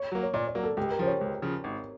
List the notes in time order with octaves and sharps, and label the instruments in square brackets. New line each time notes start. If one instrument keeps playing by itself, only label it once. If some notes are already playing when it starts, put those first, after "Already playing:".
Already playing: [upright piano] C#5
[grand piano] F#3 A#3
[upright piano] C#5
[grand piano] A#2 [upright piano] D5
[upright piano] D5
[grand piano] F#3 A#3
[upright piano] A4
[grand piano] C#2 [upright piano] G4
[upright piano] A#4
[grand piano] C#3 F3 [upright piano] C5
[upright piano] C#5
[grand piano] C#2
C#3 F3
G#1